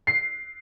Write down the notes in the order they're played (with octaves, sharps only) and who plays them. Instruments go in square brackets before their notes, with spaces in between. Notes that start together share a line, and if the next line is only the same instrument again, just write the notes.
[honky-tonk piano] C7